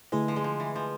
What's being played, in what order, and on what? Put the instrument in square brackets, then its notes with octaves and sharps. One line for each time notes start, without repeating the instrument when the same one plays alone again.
[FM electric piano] D3 A3 E4 G#4 B4 [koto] G#3
[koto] F3
G#3
F3
E3
F3